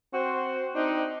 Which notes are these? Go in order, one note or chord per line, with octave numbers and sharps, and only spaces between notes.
C4 F#4 C5
C4 D4 D#4